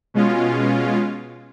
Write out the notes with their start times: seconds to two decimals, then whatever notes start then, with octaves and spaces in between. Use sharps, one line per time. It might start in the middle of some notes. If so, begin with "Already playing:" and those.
0.14 B2 G#3 C#4 F4